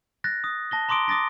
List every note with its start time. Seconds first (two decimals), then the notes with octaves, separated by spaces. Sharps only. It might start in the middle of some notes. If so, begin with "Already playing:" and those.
0.24 F#6 A6 A#6
0.44 D#6
0.71 A5 A#6 G7
0.89 A#5 C6 D6 D#6 D7 G7
1.08 D6 D#6 A6 A#6 D7